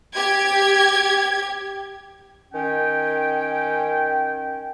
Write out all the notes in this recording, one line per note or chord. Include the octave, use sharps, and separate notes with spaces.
G4 G#6
D#3 C#4 G5